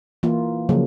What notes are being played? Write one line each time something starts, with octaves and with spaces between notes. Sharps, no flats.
E3 A#3 F4
C#3 F3 F#3 A#3